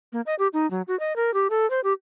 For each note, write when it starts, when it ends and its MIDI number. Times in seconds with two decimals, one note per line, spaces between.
0.13 0.21 58
0.26 0.35 75
0.39 0.48 67
0.53 0.69 63
0.71 0.82 54
0.88 0.98 66
1.00 1.15 75
1.16 1.33 70
1.34 1.48 67
1.50 1.69 69
1.70 1.80 72
1.84 1.93 67